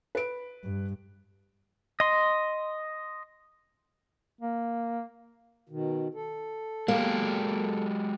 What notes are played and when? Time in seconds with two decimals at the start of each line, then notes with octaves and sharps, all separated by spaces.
0.15 B4 D7
0.64 G2
2.00 D#5 C6
4.41 A#3
5.69 B2 D#3
6.15 A4
6.88 F#3 G#3 A#3 G4